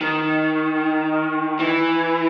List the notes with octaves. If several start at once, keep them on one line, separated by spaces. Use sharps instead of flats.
D#3
E3